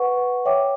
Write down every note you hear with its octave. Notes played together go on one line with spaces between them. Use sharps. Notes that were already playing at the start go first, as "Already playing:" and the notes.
Already playing: B4 F#5 C#6
C#5 E5 G5 D6